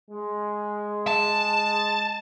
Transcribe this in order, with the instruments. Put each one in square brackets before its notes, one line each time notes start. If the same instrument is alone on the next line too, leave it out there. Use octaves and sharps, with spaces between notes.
[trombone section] G#3
[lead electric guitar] A5